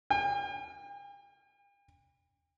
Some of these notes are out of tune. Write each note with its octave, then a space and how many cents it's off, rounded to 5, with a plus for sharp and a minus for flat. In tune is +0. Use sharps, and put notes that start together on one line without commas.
G5 +45